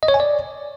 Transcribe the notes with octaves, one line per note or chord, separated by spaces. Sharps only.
D#5
C#5
G#5
D5